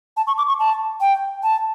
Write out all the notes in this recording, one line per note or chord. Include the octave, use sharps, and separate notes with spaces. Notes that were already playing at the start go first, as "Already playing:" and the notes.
A5
C#6
D6
C#6
A5
G5
A5